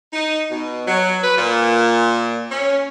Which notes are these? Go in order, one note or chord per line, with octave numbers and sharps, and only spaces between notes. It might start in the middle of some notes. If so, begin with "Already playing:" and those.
D#4
B2
F#3
B4
A#2
C#4